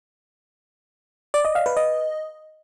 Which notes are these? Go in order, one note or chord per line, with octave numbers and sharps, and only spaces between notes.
D5
D#5
F5
B4
D#5